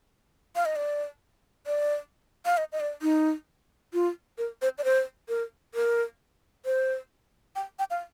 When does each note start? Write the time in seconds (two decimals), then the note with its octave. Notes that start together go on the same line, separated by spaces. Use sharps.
0.56 F5
0.65 D#5
0.76 D5
1.67 D5
2.45 F5
2.57 D#5
2.72 D#5
2.80 D5
3.02 D#4
3.94 F4
4.38 A#4
4.62 C5
4.78 D5
4.85 C5
5.29 A#4
5.75 A#4
6.65 C5
7.56 G5
7.79 G5
7.90 F5